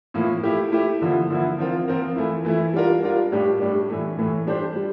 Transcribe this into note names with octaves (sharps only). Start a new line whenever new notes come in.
A2 F3 A#3 E4
A3 E4 G4
A3 E4 G4
D3 F3 A#3 E4
D3 F3 A#3 E4
F3 C4 F4 A#4
F3 C4 F4 A#4
E3 A3 E4
E3 A3 E4
G3 D4 F4 A#4
G3 D4 F4 A#4
A2 G3 D4 G4
A2 G3 D4 G4
A2 E3 A3
A2 E3 A3
G3 D4 G4 C5
G3